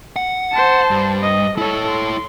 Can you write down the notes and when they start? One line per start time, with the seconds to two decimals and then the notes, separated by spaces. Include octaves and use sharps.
0.16 F#5
0.52 C5 A5
0.91 G2
1.22 D#5
1.58 E4 A4 C#5
1.88 C6